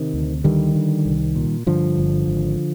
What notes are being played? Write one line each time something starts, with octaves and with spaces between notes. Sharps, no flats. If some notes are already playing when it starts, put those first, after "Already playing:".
Already playing: C3 D#3
D2
D3 D#3 G3
D3
C2
A#2
G2 D3 F3
G1
G#1